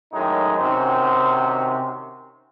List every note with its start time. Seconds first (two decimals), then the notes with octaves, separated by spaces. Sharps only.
0.13 F#2 A2 D#3 G#3 D#4
0.58 C3 D#3 C#4 F#4 C5